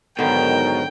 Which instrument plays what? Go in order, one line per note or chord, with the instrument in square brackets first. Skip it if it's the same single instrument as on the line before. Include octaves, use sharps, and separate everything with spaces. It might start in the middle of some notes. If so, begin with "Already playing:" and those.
[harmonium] G#2 F#3 A#4 [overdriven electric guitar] B2 [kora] D3 D#3 [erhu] G5